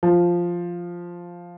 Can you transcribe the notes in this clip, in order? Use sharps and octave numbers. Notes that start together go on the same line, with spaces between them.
F3